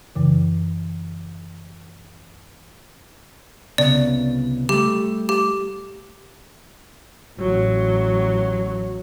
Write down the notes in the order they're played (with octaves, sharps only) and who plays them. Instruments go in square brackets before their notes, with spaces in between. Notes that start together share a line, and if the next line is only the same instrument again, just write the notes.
[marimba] F#2 C#3 E3
[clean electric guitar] C2 C#3 B3 [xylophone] D5
[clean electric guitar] G3 A3 [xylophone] G4
[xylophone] G4
[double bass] A1 F#3